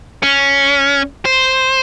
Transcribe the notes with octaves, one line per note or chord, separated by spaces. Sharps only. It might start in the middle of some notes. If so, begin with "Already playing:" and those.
C#4
C5